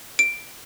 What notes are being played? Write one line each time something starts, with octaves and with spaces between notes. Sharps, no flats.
D7